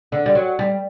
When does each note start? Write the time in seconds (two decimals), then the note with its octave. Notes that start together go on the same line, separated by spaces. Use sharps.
0.12 D3
0.26 G3
0.35 F#3
0.59 G3